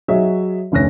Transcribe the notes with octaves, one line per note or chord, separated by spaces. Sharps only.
F#3 F#4 G#4 C#5 D#5 E5
F1 D2 C#4 F#6 A#6